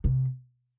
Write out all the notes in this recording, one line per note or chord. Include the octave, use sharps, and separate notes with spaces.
C3